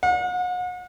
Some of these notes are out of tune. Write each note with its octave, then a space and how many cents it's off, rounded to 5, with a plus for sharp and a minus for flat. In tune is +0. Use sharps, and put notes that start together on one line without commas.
F#5 -40